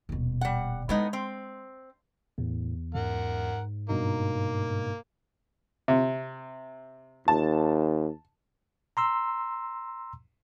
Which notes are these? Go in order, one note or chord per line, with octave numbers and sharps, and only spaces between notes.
D#1 B2
G3 F#5
A2 G#3 B3 D#4
C4
E2 A2
G#2 A#4 F#5
G2 B2 A#3 D#4
C3
D#2 A5
A#5 C6 E6